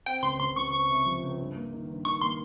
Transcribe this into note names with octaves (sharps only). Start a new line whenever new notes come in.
C4 G5
C#2 C6
C#2 C6
C#2 C#6
C4 C#6
C3
F3
C#2
G2
A#3
D#3
G2
D#3 C#6
A#3 C6